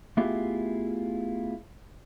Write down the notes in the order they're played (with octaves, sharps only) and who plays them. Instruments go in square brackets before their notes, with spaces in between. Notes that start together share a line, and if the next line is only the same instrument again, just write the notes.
[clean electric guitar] A3 B3 E4 F4 G4 G#4